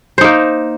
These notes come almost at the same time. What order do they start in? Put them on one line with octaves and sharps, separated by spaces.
C5 D#4 A#3